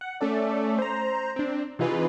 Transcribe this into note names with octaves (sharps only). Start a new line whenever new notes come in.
F#5
A3 C#4 A4 D5
C5 A#5
C4 D4
C3 E3 D#4 F4 G#4 B4